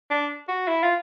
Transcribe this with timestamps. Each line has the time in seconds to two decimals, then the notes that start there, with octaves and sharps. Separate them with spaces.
0.10 D4
0.48 F#4
0.67 E4
0.83 F4